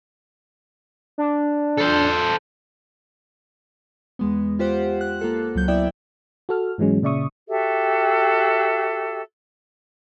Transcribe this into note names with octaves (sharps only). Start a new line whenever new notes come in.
D4
A4 C5
E2 G#3 B3
F4 G4 C5 F#5
F#6
A#3 F4 A4
C#2 F#3 G6
B3 E4 D5 E5 G5
F#4 A4 F6
G#2 E3 F#3 G#3 C#4
A#2 C#3 D5 E5 C#6 D#6
F#4 G4 A4 E5